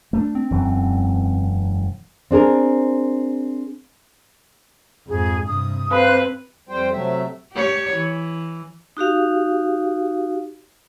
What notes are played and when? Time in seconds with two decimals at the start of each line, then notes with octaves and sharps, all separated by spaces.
0.13 A3 A#3 D4
0.35 C4
0.51 E1 F#2 E3
2.31 C4 D4 G#4 A#4
5.08 F2 G#2 G#4
5.45 G2 C3 D#6
5.92 C4 B4 C5 F5 F#6
6.69 F2 G3 C5 G5
6.93 C3 F#3 A3 E5
7.53 G4 C#5
7.94 E3
8.97 D#4 F#4 G4 F5